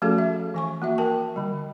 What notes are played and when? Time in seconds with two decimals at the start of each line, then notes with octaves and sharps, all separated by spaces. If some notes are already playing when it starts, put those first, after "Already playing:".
0.02 F3 A3 C#4 F#4 G#4 A4
0.18 E5
0.54 E3 G#5 C#6
0.82 A#3 F#4 E5
0.98 A#4 G5 A5
1.36 D3 G3